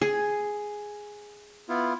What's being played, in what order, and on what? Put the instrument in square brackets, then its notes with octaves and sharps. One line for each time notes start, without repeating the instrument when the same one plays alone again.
[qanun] G#4
[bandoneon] B3 E4 F4